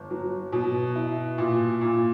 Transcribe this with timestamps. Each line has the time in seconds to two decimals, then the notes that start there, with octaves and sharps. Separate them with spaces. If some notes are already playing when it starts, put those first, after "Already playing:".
Already playing: G1
0.10 F#3
0.52 B2
0.96 E4
1.38 A#2
1.81 A#2